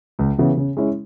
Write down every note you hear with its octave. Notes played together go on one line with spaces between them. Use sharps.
C#2
C#3 E3 B3
C#3
G#3 C#4 E4